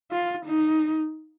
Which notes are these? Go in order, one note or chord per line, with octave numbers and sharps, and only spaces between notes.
F4
D#4